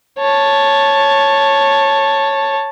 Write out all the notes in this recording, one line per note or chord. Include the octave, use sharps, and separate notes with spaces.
C#5 A5